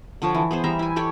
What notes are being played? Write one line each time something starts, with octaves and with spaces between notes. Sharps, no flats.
D3 F3 C#5 A5
E3
B3 G#4 C5
E3 G3 E5 A#5
E4 G#5
G4 A4 C#5 D5